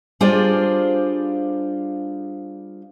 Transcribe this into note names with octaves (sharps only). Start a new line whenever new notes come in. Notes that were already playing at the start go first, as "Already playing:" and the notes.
G3 D4 F4 G#4 C5 D5